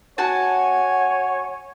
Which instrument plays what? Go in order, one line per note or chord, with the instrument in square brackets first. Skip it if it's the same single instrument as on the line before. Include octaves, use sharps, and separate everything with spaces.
[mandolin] F#4 A5 [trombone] C#5 [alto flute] F#5 [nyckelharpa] G#5